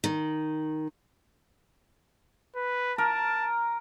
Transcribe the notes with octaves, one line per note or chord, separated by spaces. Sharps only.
D#3
B4
A#4 A5